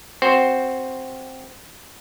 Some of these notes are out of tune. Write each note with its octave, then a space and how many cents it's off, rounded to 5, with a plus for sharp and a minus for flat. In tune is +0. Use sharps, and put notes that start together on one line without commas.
C4 +0 F#4 +0 C5 +0